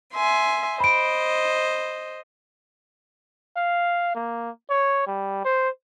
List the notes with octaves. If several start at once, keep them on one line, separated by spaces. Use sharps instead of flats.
E5 G#5 C6
C5 D#5 B5 D7
F5
A#3
C#5
G3
C5